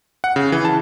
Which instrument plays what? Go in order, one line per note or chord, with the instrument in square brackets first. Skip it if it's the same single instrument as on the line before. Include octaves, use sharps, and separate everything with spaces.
[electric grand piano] F#5
C#3
E3
A5